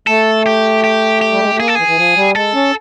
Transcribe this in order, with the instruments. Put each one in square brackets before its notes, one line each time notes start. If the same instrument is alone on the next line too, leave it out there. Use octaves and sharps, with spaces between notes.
[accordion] A3 [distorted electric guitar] A4
[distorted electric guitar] G4
G4
G4
[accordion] G3
G#3
A3
[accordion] A#3 [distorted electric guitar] G#4
[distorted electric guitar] A4
[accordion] E3 [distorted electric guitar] G#4
[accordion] E3
F3
G3
[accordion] G#3 [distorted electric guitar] A4
[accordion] C#4